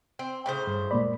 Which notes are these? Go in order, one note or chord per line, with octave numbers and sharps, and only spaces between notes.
C4
A2 C#3 C5
G2
A#2 G#3 A#3 D5 B5